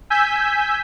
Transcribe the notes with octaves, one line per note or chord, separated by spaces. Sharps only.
G#5 E6 G6 B6